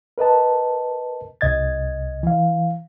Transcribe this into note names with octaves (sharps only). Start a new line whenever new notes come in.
A#4 B4 D#5 A5
C2 C3 D#5 G#6 A6
E3 F5